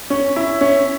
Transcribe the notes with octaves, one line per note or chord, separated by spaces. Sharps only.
C#4
E4
C#4